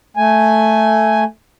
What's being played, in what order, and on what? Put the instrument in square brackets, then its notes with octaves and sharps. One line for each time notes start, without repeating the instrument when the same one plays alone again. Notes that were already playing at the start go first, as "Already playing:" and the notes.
[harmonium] A3 G#5